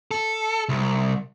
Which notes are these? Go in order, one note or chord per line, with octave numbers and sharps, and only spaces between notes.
A4
C2